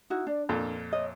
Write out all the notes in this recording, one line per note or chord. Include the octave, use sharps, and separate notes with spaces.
D#4 E4 F#4
D4 D5
F2 A#2 A#4
C#5 D#5